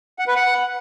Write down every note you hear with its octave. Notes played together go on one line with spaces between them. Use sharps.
F#5
B4
F#5